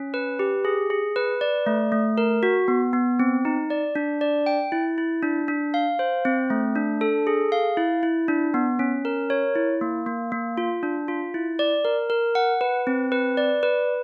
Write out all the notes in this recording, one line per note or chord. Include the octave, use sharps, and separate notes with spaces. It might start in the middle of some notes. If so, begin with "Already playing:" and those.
Already playing: C#4
B4
G4
G#4
G#4
B4
D5
A3
A3
A#4
F#4
B3
B3
C4
D#4
D5
D4
D5
G5
E4
E4
D4
D4
F5
C5
C4
A3
D4
A4
G#4
F5
E4
E4
D4
B3
C#4
A#4
C#5
E4
A#3
A#3
A#3
F4
D4
F4
E4
D5
A#4
A#4
F#5
B4
C4
B4
D5
B4